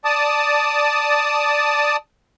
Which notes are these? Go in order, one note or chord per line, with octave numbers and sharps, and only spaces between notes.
D5 A5 D#6